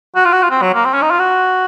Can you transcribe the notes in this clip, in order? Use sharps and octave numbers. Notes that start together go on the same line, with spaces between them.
F#4
F4
F#4
F4
C4
F#3
A#3
C4
C#4
D#4
F4
F#4